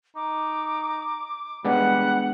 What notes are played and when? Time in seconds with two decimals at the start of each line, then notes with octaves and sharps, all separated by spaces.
0.16 D#4 D6
1.65 G3 G#3 B3 D4 F#5